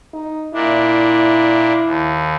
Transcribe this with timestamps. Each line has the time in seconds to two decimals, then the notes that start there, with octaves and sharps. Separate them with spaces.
0.14 D#4
0.54 A#2 D4 E4
1.85 D#2